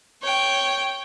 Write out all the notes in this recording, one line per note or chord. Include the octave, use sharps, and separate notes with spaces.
C#5 G5